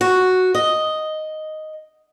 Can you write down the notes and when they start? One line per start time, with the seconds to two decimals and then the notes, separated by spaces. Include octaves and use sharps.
0.01 F#4
0.55 D#5